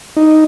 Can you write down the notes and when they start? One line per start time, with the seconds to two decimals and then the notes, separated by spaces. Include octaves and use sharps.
0.17 D#4